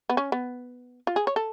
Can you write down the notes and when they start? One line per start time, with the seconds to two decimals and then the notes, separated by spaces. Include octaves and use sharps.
0.09 B3
0.17 C#4
0.32 B3
1.07 F4
1.16 G#4
1.27 C#5
1.36 A4